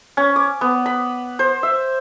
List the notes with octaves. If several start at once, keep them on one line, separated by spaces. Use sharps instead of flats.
C#4
D6
B3
B5
C5
E5